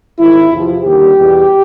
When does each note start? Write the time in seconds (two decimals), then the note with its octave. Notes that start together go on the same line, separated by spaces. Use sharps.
0.19 G#1 G#2 D#3 E4
0.52 E2 C3 F3
0.84 D#2 D3 G3 G4
1.18 E2 B2 G3